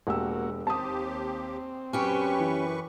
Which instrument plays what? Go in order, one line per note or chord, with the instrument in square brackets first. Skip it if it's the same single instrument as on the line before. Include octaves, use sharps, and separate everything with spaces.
[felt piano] E1 G4 E6 [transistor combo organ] A#3 F#4
[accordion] D#2 G4 [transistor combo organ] C4 [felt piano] A5 D#6
[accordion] F#2 B4 C#6 [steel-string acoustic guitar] C#4 G4
[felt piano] E3